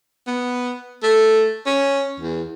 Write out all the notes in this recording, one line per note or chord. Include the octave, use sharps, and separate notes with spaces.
B3
A3
C#4
E2